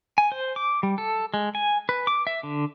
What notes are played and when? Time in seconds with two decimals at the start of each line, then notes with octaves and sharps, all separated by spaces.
0.18 G#5
0.32 C5
0.56 D6
0.83 G3
0.98 A4
1.34 G#3
1.55 G#5
1.89 B4
2.07 D6
2.27 E5
2.43 D3